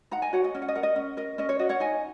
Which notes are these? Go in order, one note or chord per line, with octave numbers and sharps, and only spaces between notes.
D#4 F#5 A#5
D#5 G#5
F#4 C#5 F#5
D#5
C#4 D#5
F#5
D#5
A#4 F#5
D#5
C#4
A#4 D#5
C#4 D#5
C#5
F#4 D#5
C#5 F#5
D#4 D#5 G#5